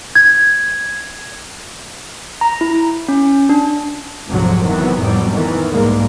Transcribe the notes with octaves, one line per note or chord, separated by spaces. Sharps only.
G#6
A#5
E4
C#4
D4
F1 D2 G#2 C3 F3 F#3
C3 D#3 E3 F#3 B3
F2 A2 F#3 G3
D#3 E3 B3
B1 G#2 G3 G#3 A#3